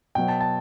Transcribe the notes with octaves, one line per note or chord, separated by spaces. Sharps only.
B2 F#3 B3 G5
A5
A5